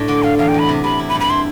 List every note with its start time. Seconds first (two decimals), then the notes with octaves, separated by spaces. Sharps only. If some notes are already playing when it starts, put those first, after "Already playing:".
Already playing: A2 D4 E4
0.08 D3 D6
0.23 D3 F5
0.38 E2 F5
0.48 G5
0.54 E2 B5
0.69 C3
0.84 C3 B5
0.99 E4
1.09 B5
1.15 G2
1.20 B5
1.30 E4 C6